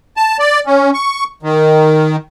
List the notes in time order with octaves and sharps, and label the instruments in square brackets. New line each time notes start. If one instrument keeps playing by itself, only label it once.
[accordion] A5
D5
C#4
C#6
D#3